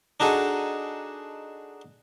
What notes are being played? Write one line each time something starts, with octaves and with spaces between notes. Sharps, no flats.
D4 D#4 F#4 G#4 A4